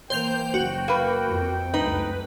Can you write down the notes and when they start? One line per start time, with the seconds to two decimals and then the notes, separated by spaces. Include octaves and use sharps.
0.10 E3 A#3 C5 G5 G6 F7
0.54 F#1 F#4
0.88 A#3 B4
1.27 F2 C4
1.74 C#2 F#2 A3 D#4 B4